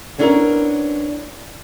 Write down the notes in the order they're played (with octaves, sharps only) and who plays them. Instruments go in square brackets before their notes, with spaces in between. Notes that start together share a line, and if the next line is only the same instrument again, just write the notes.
[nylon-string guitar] B3 C#4 D4 E4 A4 A#4